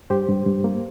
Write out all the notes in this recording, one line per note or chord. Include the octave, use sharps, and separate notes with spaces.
G2 G4 C5
G2
G2
A#3